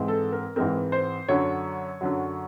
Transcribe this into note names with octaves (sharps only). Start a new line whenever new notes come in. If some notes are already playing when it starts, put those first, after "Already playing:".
Already playing: G#2 E3 G#3 C4
A4
A#4
G#2 E3 G#3 C4 A#4
C5
F#2 D3 F#3 C#5
F#2 D3 F#3